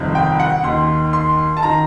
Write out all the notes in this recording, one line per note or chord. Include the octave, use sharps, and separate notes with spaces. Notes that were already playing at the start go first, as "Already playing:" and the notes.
Already playing: G1 F2 C3 D#3
G5
F#5
D#2 D#3 C6
C6
A5
D#3 A#5